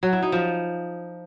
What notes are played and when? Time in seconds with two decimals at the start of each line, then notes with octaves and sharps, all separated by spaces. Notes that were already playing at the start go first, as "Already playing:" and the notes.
0.03 F#3
0.13 E4
0.22 D#4
0.32 F3